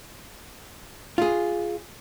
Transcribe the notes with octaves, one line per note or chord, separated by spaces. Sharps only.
F4 G#4